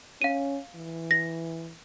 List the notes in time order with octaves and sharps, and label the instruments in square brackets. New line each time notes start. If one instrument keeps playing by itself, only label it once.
[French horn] C#4 [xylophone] F5 D#7
[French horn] E3
[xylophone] A#6